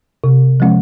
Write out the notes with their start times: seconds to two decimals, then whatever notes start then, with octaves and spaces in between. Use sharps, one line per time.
0.24 C3
0.60 F3 G#3 C#4